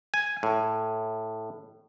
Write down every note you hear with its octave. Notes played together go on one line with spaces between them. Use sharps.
G#5
A2